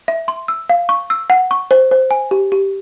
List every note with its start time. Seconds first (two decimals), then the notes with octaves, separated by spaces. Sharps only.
0.08 E5
0.28 C6
0.48 E6
0.69 F5
0.89 C#6
1.10 E6
1.30 F#5
1.51 C#6
1.71 C5
1.91 C5
2.11 G#5
2.31 G4
2.52 G4